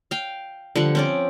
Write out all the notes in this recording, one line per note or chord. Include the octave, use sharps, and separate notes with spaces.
F5 G5
D3 F3 G3 F#5
C4 C#4 D5